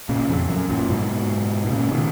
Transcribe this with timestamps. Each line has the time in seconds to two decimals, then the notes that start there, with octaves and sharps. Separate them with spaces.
0.09 A#2 C#3
0.29 F2
0.49 F#2
0.70 F#2 A#2
0.90 G#2 B2
1.65 B2
1.71 A#2 C#3
1.92 B2 D#3